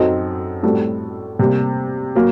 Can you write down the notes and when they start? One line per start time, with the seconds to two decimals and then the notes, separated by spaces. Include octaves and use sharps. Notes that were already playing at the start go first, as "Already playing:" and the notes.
Already playing: F#2 F#3 C4 D#4 A4
0.63 A2 G3 C4 F#4 A4
1.39 C3 G3 A#3
2.15 F#3 A#3